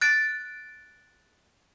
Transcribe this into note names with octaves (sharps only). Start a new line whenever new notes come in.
F#6 A6 D7